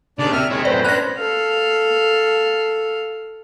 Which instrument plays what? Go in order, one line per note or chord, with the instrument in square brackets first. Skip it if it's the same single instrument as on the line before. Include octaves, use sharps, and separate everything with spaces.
[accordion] D#2 D4 D5 [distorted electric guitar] C#3
[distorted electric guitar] C3 [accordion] E5 F6
[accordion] D#2 G#3 C#5 [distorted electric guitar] C4 E4
[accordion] F#2 A2 [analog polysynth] B4 C5 [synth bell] D5
[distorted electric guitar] C#4 D4 [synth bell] F#6 A#6
[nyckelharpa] A4 F5